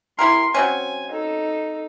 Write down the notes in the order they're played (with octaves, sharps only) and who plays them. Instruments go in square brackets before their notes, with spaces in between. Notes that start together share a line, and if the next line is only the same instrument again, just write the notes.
[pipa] E4 G4 A#4 [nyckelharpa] C6
[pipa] F#3 C4 C#4 [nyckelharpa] G#5
[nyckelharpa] D#4 A4